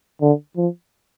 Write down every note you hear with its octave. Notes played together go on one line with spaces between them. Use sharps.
D3
F3